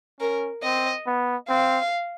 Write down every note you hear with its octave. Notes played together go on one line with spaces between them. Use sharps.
C#4 A#4
C4 D#5
B3
C4 F5